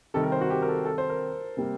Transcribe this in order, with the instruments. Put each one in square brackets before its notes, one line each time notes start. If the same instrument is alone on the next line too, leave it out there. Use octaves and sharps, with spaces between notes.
[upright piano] C3 D#3 G3 [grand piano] A4
[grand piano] A#4
C5
F#4
G4
A#4
A4
A4
C5
A#4
[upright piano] C3 G3 A#3